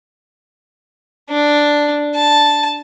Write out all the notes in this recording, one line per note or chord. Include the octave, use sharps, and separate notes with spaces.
D4
A5